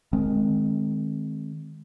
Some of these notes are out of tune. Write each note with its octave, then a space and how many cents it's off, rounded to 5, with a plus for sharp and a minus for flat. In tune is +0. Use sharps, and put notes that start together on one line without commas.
D#3 -10 G#3 +20 C4 +10